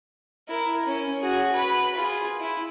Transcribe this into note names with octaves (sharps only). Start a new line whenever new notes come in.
E4 A#4
C#4
F#4 G#4
B4 B5
F4 G#4
E4